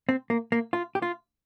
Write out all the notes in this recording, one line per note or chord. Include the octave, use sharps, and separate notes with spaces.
C4
A#3
A#3
F4
G4
F4